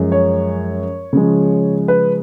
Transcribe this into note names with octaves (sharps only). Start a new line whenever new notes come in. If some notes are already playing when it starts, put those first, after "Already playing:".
Already playing: F#2 F3 G#3 C#4
C#5
C#3 F3 G#3
B4